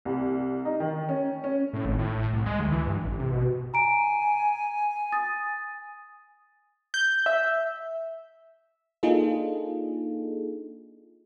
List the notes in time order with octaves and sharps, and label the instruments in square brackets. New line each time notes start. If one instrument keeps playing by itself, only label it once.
[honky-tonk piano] C2
D#4
D#3
C#4
C#4
[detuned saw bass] A2
G#1
A2
A2
C2
G#3
D2
E3
G2
A1
C3
B2
[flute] G#5 [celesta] A#5 D7
[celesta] D#6 A6
[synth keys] G6
E5
[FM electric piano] A#3 D4 D#4 F4 G#4 A4